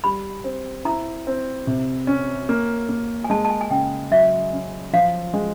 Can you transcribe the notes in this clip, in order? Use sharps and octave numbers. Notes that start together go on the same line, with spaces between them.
G3 B5
C4
E4 A#5
C4
C3
C#4
A#3
A#3
G#5
G#3 A5
A5
G#5
G#5
C#3 G5
F#3 E5
C#4
F3 F5
G#3